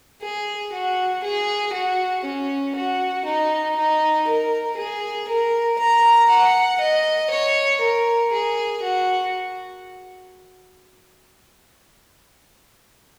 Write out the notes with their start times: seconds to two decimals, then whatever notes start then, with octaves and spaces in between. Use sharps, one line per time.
0.22 G#4
0.73 F#4
1.24 G#4
1.74 F#4
2.25 C#4
2.76 F#4
3.26 D#4
3.77 D#4
4.27 A#4
4.78 G#4
5.29 A#4
5.79 A#5
6.30 F#5
6.80 D#5
7.31 C#5
7.82 A#4
8.33 G#4
8.83 F#4